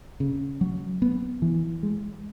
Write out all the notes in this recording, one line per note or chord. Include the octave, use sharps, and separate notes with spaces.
C#3
F#3
B3
E3
G#3